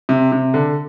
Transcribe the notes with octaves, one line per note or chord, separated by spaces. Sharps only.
C3
C3
D3